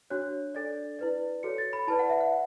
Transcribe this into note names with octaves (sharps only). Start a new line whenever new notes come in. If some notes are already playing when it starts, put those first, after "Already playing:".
D4 F#4 C#5 F#6
D4 A4 D5 A6
E4 B4 D5
F#4 A4 C#5 C#7
A6
B5
E4 B4 D5 A5
F#5
E5
F#5